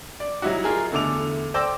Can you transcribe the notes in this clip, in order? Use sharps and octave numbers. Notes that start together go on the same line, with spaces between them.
D5
F#3 G3 D#4 E4 F#4
D#4 F4 G#4 A#4
E2 D3 A3 D6 F7
C5 D5 G5 D6 E6 A#6